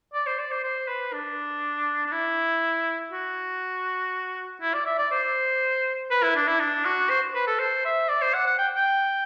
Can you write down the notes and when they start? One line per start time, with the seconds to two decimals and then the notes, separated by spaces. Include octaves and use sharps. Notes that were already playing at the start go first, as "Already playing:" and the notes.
0.13 D5
0.26 C5
0.39 D5
0.51 C5
0.64 C5
0.88 B4
1.13 D4
2.06 D4
2.12 E4
3.12 F#4
4.61 E4
4.74 D5
4.86 E5
4.98 D5
5.11 C5
6.11 B4
6.23 E4
6.35 D4
6.48 E4
6.60 D4
6.85 F#4
7.10 C5
7.35 B4
7.47 A4
7.59 C5
7.85 E5
8.09 D5
8.22 C5
8.34 F#5
8.47 F#5
8.58 G5
8.76 G5